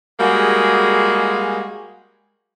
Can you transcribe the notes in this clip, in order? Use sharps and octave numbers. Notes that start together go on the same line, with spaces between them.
G3 G#3 A#3 F#4 G#4